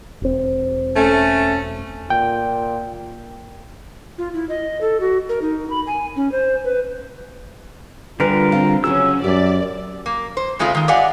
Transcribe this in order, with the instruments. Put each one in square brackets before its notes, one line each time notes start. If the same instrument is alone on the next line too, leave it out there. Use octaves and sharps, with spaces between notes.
[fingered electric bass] E1 C4
[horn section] A3 C#4
[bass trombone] A#2 [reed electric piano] G5
[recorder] F4
E4
D#5
A4
F#4
A#4
D#4
B5
G#5
C#4
C5
B4
[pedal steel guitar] D3 G3 A#4 [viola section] F4 [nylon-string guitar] B4 G#5
[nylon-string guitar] C4 F5
[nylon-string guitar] C#3 F#3 G#4 [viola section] C#4 [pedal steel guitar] E6
[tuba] F#2 [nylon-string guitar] G4 [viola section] D5
[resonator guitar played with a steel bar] A#3
C5
C#3 G#3 A3 C4 F4
D#3 G#3
G4 D5 D#5 F5 F#5 G#5